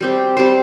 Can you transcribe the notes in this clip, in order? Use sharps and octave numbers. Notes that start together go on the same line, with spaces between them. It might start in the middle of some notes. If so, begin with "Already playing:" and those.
G3 C4 G4 C5
G3 C4 G4 C5